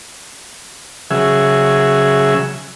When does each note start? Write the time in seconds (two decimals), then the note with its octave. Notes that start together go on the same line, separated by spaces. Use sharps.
1.11 C#3 F#3 G#4 E5